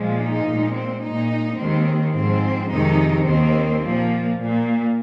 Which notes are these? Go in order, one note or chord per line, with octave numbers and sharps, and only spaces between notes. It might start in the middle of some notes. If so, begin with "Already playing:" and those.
Already playing: A#2 F3 G#3
D#4
A#2 G#3
C4
A#2 G#3 D#4
D#2 D#3 G#3 C4
G#2 F3 G#3 C4
F2 C3 D#3 G#3 D#4
D#2 D#3 A#3 C4
A#2 F3 A#3
A#2 A#3